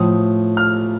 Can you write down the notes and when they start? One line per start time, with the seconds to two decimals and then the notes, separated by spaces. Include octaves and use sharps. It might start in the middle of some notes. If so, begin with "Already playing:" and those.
Already playing: A2 F3 D#6
0.57 F6